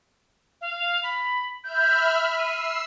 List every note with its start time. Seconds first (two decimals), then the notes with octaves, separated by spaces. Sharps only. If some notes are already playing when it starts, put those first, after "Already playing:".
0.61 F5
1.03 B5
1.64 E5 B5 F6 G6
2.38 E6 C7 D#7